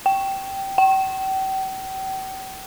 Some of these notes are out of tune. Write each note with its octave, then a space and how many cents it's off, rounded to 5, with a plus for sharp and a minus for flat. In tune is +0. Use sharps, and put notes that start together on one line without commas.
G5 -10
G5 -40